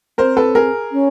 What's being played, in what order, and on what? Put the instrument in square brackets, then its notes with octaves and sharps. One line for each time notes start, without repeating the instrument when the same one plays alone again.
[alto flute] C4 [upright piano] A#4 C5
[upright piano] A4 B4
G#4 A#4
[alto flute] C#4